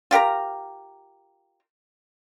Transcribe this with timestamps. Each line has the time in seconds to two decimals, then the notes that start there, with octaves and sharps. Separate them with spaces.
0.11 F4 G4 A#4 A#5